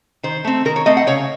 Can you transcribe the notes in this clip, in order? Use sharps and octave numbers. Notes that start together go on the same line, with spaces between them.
D#3 C5
A3 C4
D#3 A#4
C#5
A3 C4 D#5
F#5
C#3 C#5